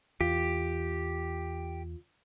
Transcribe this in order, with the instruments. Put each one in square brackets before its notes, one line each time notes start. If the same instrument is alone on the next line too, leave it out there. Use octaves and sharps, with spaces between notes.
[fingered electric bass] E2 [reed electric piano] F4 [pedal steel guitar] G4